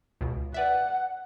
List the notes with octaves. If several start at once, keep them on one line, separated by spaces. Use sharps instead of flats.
C#2 B2
B4 D5 E5 F#5